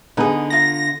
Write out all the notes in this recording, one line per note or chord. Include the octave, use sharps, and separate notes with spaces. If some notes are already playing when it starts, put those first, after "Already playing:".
D3 B3 D#4 G#4 B4
F4 A#5 A#6